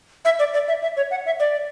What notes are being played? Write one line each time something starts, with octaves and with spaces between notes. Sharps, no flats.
E5
D5
D5
E5
E5
C#5
F#5
E5
D5